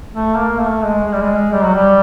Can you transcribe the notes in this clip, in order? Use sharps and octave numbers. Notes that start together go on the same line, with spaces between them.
A3
A#3
A3
G#3
G#3
G3
G#3
G3
F#3
G3